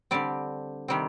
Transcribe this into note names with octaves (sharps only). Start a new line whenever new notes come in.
D3 G3 C4 D5
C3 D#3 G3 C4